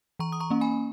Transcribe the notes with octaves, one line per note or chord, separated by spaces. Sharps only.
E3 A#5 C#6
D#6
A#5 C#6
A#3 C#4
G#5 B5